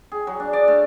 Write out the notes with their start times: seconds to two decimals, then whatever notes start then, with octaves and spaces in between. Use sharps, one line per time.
0.12 G#4
0.27 F#3
0.40 D4
0.53 D5
0.68 A3